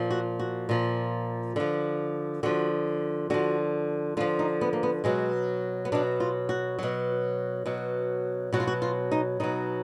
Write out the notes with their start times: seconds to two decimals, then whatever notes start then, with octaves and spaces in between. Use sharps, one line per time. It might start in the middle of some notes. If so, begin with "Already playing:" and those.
Already playing: A#2 F3
0.11 F#4
0.39 F#4
0.69 A#2 F3
1.56 D3 F3
2.43 D3 F3 F#4
3.30 D3 F3 F#4
4.17 D3 F4
4.21 F3
4.39 D#4
4.61 B3
4.73 A#3
4.83 B3
5.04 B2 F#3 G#3
5.85 B3
5.92 B2 F#3 D4
6.20 F4
6.49 F#4
6.79 B2 F#3
7.66 B2 F#3
8.53 B2 F#3 F#4
8.60 F4
8.67 F#4
8.82 F4
9.11 D#4
9.40 B2 F#3 D#4